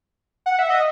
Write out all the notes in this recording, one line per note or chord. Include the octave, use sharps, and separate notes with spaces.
F#5
E5
D#5